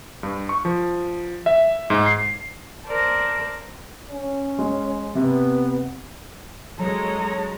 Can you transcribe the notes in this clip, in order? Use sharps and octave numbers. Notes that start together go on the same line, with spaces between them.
G2
C#6
F3
E5
G#2
C7
A#4 C5 D5 A5
C#4
G#3
C3 B3
F#3 G#3 A4 C#5 A#5